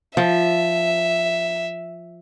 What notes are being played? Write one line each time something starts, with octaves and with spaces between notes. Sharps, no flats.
F3 E5